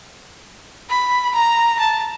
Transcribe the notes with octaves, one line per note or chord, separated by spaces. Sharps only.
B5
A#5
A5